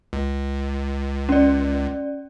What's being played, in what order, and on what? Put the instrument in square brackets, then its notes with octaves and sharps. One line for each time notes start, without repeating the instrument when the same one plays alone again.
[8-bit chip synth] C#2
[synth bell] C#4 D5